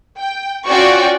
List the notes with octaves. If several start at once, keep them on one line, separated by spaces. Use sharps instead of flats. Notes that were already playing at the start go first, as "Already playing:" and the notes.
G5
C#4 F4 F#4 D5 G5 C#6